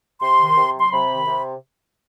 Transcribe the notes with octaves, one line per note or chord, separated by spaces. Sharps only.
C3 C6
D#3
C3
F#3 C6
C3 B5
D#3
C3